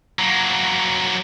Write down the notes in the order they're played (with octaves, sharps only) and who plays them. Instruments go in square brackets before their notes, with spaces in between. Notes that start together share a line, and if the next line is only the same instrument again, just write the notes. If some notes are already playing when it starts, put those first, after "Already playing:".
[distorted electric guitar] F#3 A#3